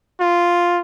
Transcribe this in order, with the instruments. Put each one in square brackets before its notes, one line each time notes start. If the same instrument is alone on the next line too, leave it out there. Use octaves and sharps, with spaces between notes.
[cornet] F4